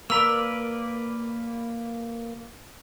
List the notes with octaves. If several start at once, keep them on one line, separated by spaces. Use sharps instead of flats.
A#3 A#4 B4 D5 A#5 E6